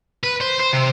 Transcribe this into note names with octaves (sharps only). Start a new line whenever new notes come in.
B4
C5
C5
C3